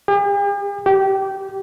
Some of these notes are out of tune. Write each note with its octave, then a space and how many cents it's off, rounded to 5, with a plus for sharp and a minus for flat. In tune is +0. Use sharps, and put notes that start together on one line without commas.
G4 +45
G4 -20